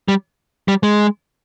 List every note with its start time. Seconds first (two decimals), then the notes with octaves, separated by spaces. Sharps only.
0.08 G3
0.68 G3
0.83 G#3